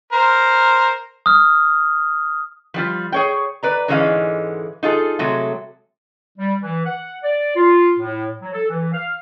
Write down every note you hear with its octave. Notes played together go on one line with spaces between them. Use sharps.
A#4 C5
D#6 F6
F3 G3 F4
G#4 C#5 G5
B4 D5 A#5
G#2 D3 E3 G#3 C#4 F5
D#4 F4 G#4 A4
C3 F#3 G#3 A3
G3
E3
F#5
D5
F4
A2
F#3
A4
E3
F5